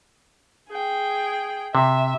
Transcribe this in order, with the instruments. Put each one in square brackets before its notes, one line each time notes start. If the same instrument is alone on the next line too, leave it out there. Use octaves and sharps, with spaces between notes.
[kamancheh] G#4 G5
[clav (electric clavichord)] C3 [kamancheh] E5